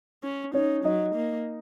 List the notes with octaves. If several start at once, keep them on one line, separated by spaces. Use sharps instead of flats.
C#4
C#4 D#4 C#5
F#3 D#4 D#5
A#3